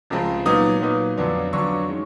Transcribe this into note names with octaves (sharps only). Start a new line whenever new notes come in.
C#2 C3 F3 G#3 C4
A#2 F#3 B3 D#4 D#6
A#2 F#3 B3 D#4
F2 D3 F#3 B3 D4
F2 D3 F#3 B3 D4 C#6
D#3 G#3 C#4